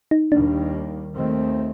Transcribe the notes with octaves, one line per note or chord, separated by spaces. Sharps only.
D#4
D#2 D#3 G3 A#3 D4
D#2 D#3 A3 C4